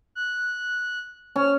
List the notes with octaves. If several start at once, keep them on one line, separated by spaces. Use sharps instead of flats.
F#6
C#4 F6